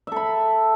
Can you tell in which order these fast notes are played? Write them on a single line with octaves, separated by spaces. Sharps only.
E5 A4 B5